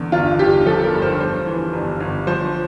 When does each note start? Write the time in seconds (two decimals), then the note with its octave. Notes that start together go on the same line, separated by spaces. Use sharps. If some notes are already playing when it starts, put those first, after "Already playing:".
Already playing: E2 D3
0.12 G1 F4
0.39 G1 G4
0.66 F3 A4
0.84 A#4
0.94 G2
1.02 C5
1.20 G2 C5
1.46 E3
1.73 G1
2.00 G1
2.27 F3 C5